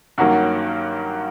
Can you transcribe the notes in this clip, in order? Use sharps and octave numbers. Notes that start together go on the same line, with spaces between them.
G2 D#3 F#3 A#3 C#4 F#4